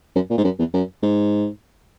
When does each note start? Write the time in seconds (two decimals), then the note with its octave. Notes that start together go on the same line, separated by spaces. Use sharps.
0.15 F#2
0.30 A#2
0.38 G#2
0.44 F#2
0.59 E2
0.74 F#2
1.03 G#2